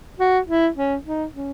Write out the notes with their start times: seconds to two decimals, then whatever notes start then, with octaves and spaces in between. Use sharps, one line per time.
0.19 F#4
0.48 E4
0.76 C#4
1.05 D#4
1.34 C#4